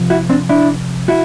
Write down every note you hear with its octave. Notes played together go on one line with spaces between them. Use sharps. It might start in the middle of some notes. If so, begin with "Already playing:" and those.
Already playing: C3 F3
E4 F#4
C4 D4
D4 E4
E4 F#4